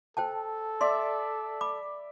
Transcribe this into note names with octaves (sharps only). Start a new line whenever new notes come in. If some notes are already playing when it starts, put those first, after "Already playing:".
A4 C5 G5 A5
D5 E5 C6
B5 D6